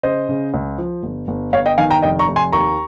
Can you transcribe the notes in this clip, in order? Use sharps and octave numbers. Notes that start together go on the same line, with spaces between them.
C#3 C5 D#5
C#3
C#2
F3
G1
G1
G1 C#5 F5
D#5 G5
D#3 F5 G#5
G5 A#5
F1 D#5 G5
A#5 C#6
F1
G#5 C6
D#2 A#5 C#6